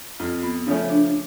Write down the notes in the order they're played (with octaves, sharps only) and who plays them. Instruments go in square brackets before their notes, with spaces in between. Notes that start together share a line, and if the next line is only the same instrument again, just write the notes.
[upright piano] F2 [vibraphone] F4
[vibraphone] B3
[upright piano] C#3 F3 A3 C#4
[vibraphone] D4